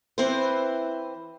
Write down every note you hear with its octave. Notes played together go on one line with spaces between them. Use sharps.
E3 C4 E4 B4 C5